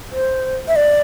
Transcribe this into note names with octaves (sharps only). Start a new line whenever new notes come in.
C5
E5
D5